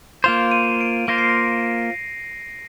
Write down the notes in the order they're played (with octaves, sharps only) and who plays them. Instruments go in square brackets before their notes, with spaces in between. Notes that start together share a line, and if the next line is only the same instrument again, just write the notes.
[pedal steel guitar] A#3 F4 C5 [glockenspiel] F7
[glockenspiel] D#7
D7
[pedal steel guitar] A#3 F4 C5 [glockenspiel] A#6
[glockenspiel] C7
A#6